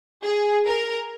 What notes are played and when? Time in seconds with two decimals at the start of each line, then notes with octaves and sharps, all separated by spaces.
0.23 G#4
0.65 A#4